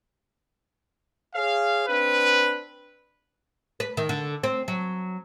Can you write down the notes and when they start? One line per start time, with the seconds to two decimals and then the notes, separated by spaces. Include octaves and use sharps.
1.35 G#4 C#5 F5
1.87 C4 D4 B4
3.80 B4
3.97 D#3
4.09 D3
4.43 C4
4.68 F#3